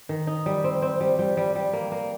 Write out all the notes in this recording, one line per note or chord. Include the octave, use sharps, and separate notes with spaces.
D#3
D#4
G3
C4
C4
G3
G3
G3
G3
A#3
A#3